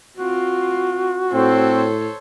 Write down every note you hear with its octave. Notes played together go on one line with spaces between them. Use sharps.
C4 F4 F#4
A2 C4 A4 C5 C#5